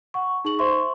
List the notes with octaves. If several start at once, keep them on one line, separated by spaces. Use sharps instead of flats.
F#5 C#6
D#4 G#4 C#6 F#7
C5 E5 C6 C#6